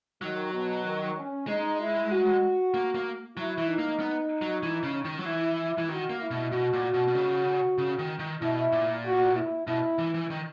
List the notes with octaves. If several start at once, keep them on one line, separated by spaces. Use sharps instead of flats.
D#3 F#3
B2
D#3
C#4
G#3 D#4
E4
F#4
A#3
A#3
F#3 E4
E3
D#4
A#3
B3
F#3
E3
C#3
D#3
F#3
E3 E4
E3
D#3 F#4
A#3
E4
B2
B2 F#4
A#2
B2
B2
C#3
C#3
D#3
D#3
B2 E4
A#2
F#4
E4
B2 E4
E3
E3
D#3